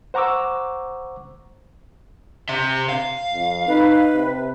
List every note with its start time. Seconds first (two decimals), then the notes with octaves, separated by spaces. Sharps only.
0.14 C5 F#5 A#5 C#6 D6 E6
2.49 C3 E5
2.89 F5
3.34 F2
3.68 D#4 B4
4.14 C3